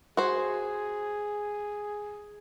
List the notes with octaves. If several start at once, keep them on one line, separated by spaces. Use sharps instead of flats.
F#4 G#4 C5